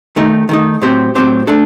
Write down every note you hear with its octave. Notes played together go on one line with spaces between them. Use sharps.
D#3 A3 D#4
D#3 A3 D#4
A2 F#3 C4 G4 C5
A2 F#3 C4 G4 C5
A3 D4 A4